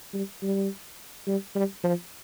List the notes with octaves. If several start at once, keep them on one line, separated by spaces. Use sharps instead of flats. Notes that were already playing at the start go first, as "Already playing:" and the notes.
G3
G3
G3
G3
F3